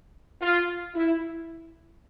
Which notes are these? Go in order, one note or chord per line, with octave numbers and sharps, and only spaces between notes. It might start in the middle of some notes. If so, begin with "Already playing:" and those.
F4
E4